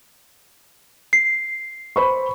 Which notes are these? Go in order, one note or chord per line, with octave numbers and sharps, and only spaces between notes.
C7
C5 B5 C#6